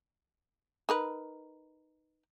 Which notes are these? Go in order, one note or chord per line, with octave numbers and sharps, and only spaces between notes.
D#4 A#4 B4